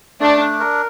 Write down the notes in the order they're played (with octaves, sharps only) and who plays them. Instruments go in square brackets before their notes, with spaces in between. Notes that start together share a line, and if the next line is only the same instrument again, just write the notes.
[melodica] A3 [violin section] D4
[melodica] D4
A#4